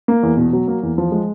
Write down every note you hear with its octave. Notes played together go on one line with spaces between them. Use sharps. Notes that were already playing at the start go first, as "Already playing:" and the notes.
A#3
E2
B2
F#3
A#3
E2
F3
G#3